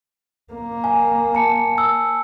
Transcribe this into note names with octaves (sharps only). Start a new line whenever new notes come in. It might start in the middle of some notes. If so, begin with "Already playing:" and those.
A#3
G#5
A5 C#7
E6